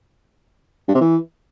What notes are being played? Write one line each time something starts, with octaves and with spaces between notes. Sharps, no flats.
G2
C3
E3